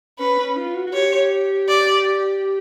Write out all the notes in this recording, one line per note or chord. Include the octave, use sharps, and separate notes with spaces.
C#4 B4
C#4
F4
F#4
F#4
G4 C#5
D5